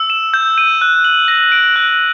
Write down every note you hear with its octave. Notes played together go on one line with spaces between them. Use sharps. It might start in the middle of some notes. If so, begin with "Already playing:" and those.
Already playing: E6
E7
G6
D#7
F#6
F#7
A#6
D7
F#6